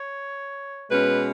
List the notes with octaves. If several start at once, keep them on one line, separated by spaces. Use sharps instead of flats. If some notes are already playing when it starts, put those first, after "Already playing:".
Already playing: C#5
B2 G#3 C#4 B4